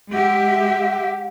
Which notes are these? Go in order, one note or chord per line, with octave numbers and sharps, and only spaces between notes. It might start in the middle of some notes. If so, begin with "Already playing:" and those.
G#3 G4 E5 F#5